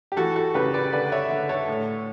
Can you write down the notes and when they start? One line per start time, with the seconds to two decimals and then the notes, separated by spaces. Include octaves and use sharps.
0.12 G4
0.17 E3 F#4 A4
0.36 F#4 A4
0.54 C#3 G4 B4
0.74 B4 D5
0.93 D3 B4 D5
1.12 C#5 E5
1.30 D3
1.49 A4 C#5
1.68 A2